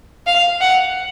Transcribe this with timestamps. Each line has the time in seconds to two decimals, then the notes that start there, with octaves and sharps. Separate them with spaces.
0.26 F5
0.60 F#5